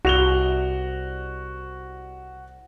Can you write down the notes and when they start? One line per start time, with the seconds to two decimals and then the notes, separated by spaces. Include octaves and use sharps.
0.05 C2 F#4 F7 G7